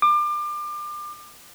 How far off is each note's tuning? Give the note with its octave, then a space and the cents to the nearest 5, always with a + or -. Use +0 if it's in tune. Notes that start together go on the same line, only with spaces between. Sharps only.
D6 +30